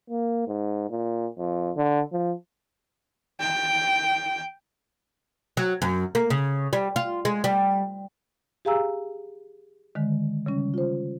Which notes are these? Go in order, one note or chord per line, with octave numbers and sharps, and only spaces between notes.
A#3
G#2
A#2
F2
D3
F3
G5
F#3
F#2
A#3
C#3
G3
F4
G#3
G3
G4 G#4 F5 G#5 A#5 E6
D3 D#3 G#3
C#3 G3 C#4
F4 C5